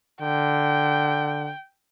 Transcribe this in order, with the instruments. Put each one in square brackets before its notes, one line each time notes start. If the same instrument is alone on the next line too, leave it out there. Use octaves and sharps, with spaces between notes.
[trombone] D3 [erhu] G5